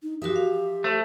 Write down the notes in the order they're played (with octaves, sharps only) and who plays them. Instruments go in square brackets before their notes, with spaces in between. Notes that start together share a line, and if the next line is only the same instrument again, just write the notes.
[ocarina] D#4
[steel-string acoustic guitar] F3 E5 [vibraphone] F#4 A#4 D#6 [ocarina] G4
[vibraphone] F5
[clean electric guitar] A3 [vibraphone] C5